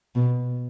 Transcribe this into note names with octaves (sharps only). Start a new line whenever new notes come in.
B2